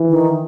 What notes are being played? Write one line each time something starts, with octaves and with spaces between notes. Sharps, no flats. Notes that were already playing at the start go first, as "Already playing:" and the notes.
Already playing: E3
D#3